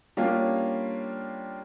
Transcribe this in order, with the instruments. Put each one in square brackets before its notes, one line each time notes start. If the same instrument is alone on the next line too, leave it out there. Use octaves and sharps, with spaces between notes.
[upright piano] G3 A#3 C#4 D4 F4